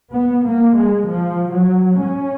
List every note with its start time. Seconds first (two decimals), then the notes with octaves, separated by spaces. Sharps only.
0.13 B3
0.44 A#3
0.76 G#3
1.07 F3
1.54 F#3
2.02 C#4